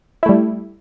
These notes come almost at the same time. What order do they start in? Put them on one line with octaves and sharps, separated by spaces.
E4 A3 G3